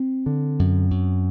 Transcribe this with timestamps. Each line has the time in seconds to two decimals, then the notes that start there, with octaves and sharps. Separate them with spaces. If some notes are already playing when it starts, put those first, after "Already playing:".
Already playing: C4
0.26 D3
0.59 F#2
0.91 F#2